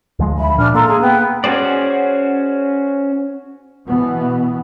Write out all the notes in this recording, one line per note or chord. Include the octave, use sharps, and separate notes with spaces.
D2 F3 G#3
E5 B5
A#2 D4 F6
A#3 A4 A#5 C6
G#4
B3 F#5 G5
C#4 F#4 G#4 C5 D5
B2 E3 B3